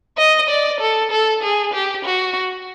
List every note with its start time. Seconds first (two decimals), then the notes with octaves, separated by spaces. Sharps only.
0.18 D#5
0.49 D5
0.80 A4
1.11 A4
1.43 G#4
1.73 G4
2.05 F#4